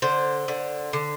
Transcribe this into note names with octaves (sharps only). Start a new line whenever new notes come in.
D3 C5
D3
D3